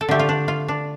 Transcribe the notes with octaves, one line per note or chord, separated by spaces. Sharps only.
A4
D3 A3 G4
F4
D4
F4
D4